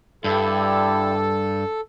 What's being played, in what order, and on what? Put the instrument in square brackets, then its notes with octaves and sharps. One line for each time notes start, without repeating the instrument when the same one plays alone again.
[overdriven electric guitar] G2 [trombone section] D3 E4 G4 [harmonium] A4